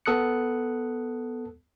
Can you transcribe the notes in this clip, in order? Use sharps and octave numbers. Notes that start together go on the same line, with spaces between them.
B3 A4 D#6 F#6 C#7